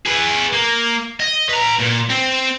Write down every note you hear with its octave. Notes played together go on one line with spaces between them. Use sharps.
G#4 B4
A#3
D#5
B4 A#5
A#2
C4